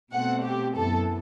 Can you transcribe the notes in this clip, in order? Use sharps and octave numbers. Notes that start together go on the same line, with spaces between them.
B2 A3 C4 F#5
G4
F#2 E3 B3 A4